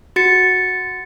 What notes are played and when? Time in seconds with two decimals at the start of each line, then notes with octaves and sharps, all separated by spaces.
0.16 F#4 A6 C#7